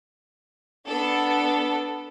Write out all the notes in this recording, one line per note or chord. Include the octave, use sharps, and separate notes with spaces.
B3 D4 A4